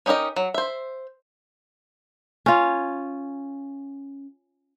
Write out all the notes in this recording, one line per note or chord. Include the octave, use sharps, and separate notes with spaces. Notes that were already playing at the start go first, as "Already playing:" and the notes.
C#4 D#4 G4 A#4 D#5
F#3
C5 E5
C#4 F4